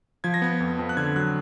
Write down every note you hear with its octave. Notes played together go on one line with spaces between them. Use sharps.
F3 G#6
A#6
B3 G#6
F2
F2
F#6
D3 G#6
F#3 F#6